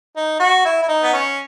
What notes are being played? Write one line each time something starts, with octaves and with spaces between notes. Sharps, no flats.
D#4
F#4
E4
E4
D#4
B3
C#4